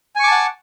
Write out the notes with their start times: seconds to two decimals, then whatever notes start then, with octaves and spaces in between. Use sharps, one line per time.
0.16 G#5
0.20 C#6
0.23 D6
0.27 A5
0.31 F#5